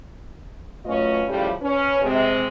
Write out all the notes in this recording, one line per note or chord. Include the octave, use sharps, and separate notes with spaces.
F#2 A3 C#4 F4 B4 D#5
A2 C#3 F3 G3
C#4 B4
C3 G#3 C4